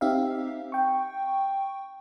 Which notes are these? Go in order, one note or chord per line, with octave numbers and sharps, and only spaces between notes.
C4 D#4 G4 E5 F5
G5 C#6